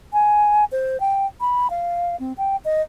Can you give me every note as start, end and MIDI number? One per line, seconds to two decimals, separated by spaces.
0.13 0.65 80
0.72 1.00 72
1.00 1.26 79
1.41 1.70 83
1.70 2.16 77
2.20 2.33 60
2.38 2.56 79
2.65 2.82 75